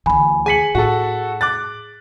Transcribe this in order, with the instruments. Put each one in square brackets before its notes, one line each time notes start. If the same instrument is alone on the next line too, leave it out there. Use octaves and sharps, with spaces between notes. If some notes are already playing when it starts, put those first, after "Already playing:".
[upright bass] D2 E3 [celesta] G#5 B5
[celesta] G#4 C#7 [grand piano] G#5 B6 F#7
[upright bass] A2 [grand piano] F#4 A4
[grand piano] D6 F#6 A6